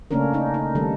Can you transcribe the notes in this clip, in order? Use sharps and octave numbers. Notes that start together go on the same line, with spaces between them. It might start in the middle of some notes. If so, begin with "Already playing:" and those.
C#3 A3 A#3 C#4 D4 A#4
D4 D#4
D#4
D#3 G3 A3 A4